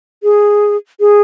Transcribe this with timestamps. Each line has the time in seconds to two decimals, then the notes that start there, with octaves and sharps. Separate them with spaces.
0.23 G#4
1.00 G#4